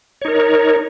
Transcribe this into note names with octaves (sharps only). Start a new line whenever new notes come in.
D#4 A#4 C#5